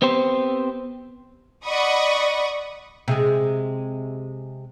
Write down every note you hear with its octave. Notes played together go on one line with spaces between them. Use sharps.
B3 C4 G4 C5
D5 D#5 F#5 B5 C#6 D#6
C3 G#3 G#4